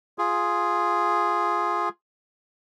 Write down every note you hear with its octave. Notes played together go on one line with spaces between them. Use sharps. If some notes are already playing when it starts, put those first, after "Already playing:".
F4 G#4